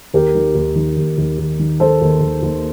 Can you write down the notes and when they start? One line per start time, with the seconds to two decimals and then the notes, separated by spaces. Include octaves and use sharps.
0.14 D#2 G4 A#4
0.35 D#3
0.55 D#2
0.76 D#3
0.97 D#2
1.18 D#2
1.38 D#2
1.59 D#3
1.80 D#3 A4 C5
2.01 D#2
2.21 D#2
2.42 D#2